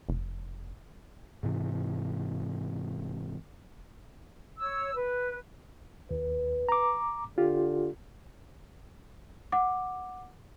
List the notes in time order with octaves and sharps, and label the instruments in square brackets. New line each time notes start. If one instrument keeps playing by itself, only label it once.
[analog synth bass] F1
[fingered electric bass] G#2 C3 E3
[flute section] C#5 E6
B4
[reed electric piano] D#2 [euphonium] B4
[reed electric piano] A#5 D6
[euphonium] D3 [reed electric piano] F4 G4
[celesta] F#5 D6